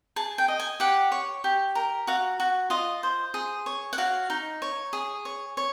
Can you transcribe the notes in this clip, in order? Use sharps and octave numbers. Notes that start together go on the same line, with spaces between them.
G#4 A5
G5
D#5
G#5
G4 F#5
C#5
G4
A#4
F#4 F5
F#4
F4 D#5
C5
G#4
C#5
F#5
F#4 F5
D#4
C#5
G#4
C#5
C#5